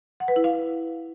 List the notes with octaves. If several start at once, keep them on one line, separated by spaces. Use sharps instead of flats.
F#5
B4
E4
F5